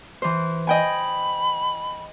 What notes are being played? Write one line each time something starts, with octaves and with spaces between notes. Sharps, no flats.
E3 C5
D#5 G5 G#5 B5